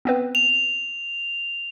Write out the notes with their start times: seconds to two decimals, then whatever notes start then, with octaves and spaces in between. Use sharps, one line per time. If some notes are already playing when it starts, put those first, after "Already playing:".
0.05 B3 C4 B4
0.35 F7